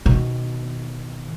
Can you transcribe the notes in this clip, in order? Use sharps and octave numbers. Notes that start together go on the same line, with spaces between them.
B2 D#3